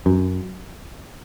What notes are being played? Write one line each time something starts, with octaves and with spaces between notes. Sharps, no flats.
F#2